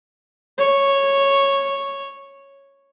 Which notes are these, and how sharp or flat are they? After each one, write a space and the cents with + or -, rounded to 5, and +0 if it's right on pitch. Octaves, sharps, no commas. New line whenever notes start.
C#5 -5